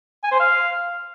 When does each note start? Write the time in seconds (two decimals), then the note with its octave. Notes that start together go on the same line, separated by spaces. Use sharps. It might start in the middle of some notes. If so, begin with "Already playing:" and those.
0.23 G#5
0.32 C5
0.40 F5